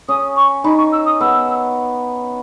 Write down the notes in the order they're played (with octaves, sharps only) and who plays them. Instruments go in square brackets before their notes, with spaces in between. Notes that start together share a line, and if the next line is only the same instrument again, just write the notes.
[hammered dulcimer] C#4 [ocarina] D#6
[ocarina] C#6
[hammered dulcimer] D#4 [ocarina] B5
[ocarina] C#6
E6
D#6
[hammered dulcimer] B3 [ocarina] E6